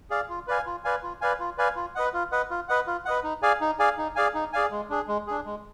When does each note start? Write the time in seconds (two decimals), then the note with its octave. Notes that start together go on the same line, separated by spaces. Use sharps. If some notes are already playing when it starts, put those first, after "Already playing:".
0.10 G#4 D5 F5
0.29 F4
0.48 B4 D5 F5 G#5
0.66 F4
0.85 B4 D5 F5 G#5
1.03 F4
1.21 B4 D5 F5 G#5
1.40 F4
1.58 B4 D5 F5 G#5
1.76 F4
1.95 B4 D#5 F#5
2.13 F4
2.32 B4 D#5 F#5
2.50 F4
2.69 B4 D#5 F#5
2.87 F4
3.05 B4 D#5 F#5
3.24 D#4
3.42 G#4 D5 F5 G#5
3.61 D#4
3.79 G#4 D5 F5 G#5
3.98 D#4
4.15 G#4 D5 F5 G#5
4.34 D#4
4.53 G#4 D5 F5 G#5
4.71 G#3
4.90 D4 G#4
5.08 G#3
5.27 D4 G#4
5.45 G#3